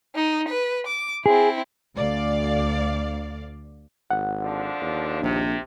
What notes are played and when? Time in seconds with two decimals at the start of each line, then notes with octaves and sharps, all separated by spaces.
0.15 D#4
0.49 B4
0.87 D6
1.26 C4 E4 G#4
1.95 D2 D5 F5
4.11 G#1 F#5
4.41 D3 F3 D4
4.82 D#2
5.22 A#1 C3